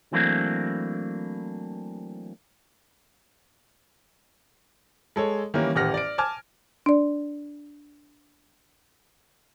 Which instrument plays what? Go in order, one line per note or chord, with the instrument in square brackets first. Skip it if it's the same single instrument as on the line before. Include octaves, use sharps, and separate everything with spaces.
[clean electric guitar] E3 F#3 A3 A#3 C4 D4
[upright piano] G#3 A4 C#5
D#3 E3 G3 A#3 C#4
D#1 A1 G4 F#5 F6 A#6
D5 D7
G#5 A5 D6 F6 G#6
[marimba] D4 D5